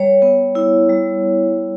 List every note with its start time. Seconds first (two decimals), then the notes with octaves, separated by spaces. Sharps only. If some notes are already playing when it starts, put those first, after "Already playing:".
Already playing: G3 C#5
0.22 B3
0.55 E4
0.89 G3